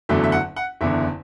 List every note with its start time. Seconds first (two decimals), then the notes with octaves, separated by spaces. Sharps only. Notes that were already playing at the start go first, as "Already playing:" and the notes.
0.09 F#1 E2 D3 F#3 A3 E5
0.24 E5
0.32 F#5
0.56 F#5
0.81 F#1 E2 D3 E5